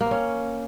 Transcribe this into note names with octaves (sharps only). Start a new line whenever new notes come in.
A#3
C4
C#4